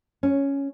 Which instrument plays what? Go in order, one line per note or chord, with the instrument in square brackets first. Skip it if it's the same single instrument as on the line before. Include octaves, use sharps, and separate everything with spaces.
[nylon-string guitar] C#4